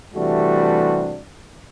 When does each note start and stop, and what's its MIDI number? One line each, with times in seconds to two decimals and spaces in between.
0.15 1.20 48
0.15 1.20 52
0.15 1.20 55
0.15 1.20 57
0.15 1.20 62
0.15 1.20 66